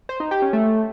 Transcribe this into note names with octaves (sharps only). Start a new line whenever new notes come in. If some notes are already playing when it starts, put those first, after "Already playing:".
C5
D#4
G4
C#4
A3